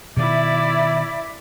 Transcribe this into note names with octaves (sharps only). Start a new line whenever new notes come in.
B2 D#3 E4 D5 E5